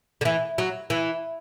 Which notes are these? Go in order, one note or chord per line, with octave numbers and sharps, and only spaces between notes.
D3
E3
F#3
E3